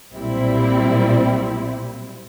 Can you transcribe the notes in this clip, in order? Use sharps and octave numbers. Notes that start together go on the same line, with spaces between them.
B1 A#2 G3 C4 E4